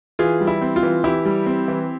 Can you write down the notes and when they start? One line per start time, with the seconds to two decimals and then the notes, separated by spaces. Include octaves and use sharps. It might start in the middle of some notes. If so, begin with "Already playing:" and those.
0.19 E3 F4 G#4
0.41 G3
0.47 E4
0.61 C4
0.76 F4
0.83 E3
1.04 E3 E4 G4
1.25 G3
1.46 C4
1.68 E3